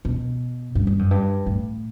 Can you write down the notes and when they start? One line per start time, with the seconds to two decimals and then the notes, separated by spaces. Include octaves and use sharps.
0.05 B2
0.75 G2
0.87 G2
0.99 F#2
1.11 G2
1.46 A2